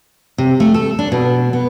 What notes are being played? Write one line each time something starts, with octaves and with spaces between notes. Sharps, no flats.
C3
A3
A4
D4
B2
B3